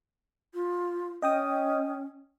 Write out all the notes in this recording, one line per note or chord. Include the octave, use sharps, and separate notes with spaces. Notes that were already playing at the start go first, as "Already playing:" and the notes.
F4
C#4 D#5 G5 D#6